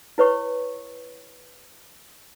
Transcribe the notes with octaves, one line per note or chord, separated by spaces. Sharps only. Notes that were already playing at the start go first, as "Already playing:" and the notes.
E4 B4 C#5 C#6